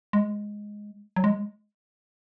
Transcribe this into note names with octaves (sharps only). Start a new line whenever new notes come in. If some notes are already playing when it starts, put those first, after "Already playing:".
G#3
F#3
G#3